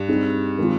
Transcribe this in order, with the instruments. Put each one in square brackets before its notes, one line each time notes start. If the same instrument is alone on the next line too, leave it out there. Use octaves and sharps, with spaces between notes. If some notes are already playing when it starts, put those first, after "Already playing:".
Already playing: [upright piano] G2
[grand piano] G3 C4 D#4 G#4
D#3 G#3 C4 F4